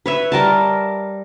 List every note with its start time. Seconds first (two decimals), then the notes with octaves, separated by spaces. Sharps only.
0.06 B4 C#5 E5
0.32 G3 A#4 A5